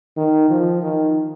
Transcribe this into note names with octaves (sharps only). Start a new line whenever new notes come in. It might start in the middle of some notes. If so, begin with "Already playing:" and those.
D#3
F3
D#3